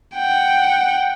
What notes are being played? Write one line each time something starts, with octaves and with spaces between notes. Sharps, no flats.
F#5 G5